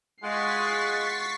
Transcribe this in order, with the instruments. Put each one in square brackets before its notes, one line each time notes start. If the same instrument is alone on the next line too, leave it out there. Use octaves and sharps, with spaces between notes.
[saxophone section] G#3 [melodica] F4 F#5 [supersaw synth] C#6 B6 [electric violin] A6 C7